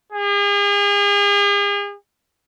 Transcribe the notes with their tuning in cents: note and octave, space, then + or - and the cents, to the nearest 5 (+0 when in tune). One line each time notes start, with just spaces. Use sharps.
G#4 -40